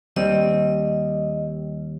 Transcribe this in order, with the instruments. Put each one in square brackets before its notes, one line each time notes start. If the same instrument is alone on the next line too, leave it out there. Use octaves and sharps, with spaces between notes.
[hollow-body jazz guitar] D#2 G3 C4 [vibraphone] D#5